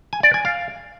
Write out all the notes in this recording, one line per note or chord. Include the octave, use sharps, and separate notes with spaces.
G#5
D5
G#5
F5